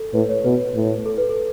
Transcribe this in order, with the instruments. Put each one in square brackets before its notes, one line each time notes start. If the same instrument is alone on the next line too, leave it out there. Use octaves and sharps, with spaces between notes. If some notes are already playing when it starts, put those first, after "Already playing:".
Already playing: [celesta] A4
[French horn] A2 [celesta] B4
[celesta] C#5
[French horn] B2 [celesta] B4
[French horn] A2
[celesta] A4
B4
A4